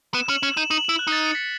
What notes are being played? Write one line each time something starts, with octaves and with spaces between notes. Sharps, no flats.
B3 E7
C#4 F#7
C#4 E7
D#4 E7
D#4 F#7
E4 E7
F#6
D#4 A6
C#7
B6